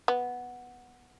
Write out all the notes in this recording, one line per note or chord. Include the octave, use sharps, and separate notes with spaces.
B3